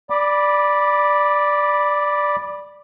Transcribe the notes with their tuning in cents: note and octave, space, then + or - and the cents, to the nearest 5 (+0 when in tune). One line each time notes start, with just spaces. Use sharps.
D5 +0 B5 -10 D6 +25